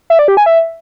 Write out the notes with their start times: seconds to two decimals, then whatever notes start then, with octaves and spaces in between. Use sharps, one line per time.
0.10 E5
0.19 D5
0.28 G4
0.37 G#5
0.46 E5